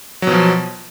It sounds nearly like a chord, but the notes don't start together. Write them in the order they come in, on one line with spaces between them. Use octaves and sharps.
F#3 B2 F3